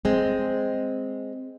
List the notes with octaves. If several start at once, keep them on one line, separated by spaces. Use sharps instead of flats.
G#3 C4